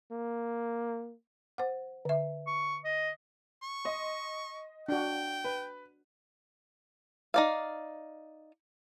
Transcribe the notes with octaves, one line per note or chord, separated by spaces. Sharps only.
A#3
C5 F#5
D3 E5
C#6
D#5
C#6
D#5 C6
D4 F#4 G5
B4
D#4 D5 F5